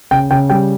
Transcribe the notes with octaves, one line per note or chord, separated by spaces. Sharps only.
C#3 G5
C#3 G5
G3 G5